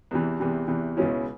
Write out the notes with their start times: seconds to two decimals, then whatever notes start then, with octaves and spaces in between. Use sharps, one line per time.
0.11 E2 C3 E3
0.40 E2 C3 E3
0.68 E2 C3 E3
0.97 C#2 B2 G#3 C#4 E4